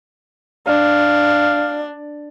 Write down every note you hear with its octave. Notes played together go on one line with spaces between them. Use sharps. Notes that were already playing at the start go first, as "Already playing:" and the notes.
D4 F5